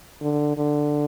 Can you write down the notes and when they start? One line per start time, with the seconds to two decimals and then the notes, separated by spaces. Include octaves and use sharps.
0.21 D3
0.57 D3